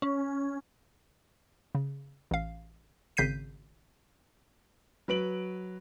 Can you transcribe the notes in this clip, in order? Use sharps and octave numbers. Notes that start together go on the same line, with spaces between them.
C#4
C#3
A1 F5
G#1 C#3 G6 B6 C7 D#7
F#3 B4 D7 F#7